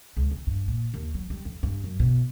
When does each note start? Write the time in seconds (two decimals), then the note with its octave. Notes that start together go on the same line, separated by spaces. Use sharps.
0.17 C#2
0.31 E2
0.47 G2
0.68 A#2
0.94 D#2
1.14 F#3
1.30 G3
1.45 F2
1.63 G2
1.84 F#2
2.00 B2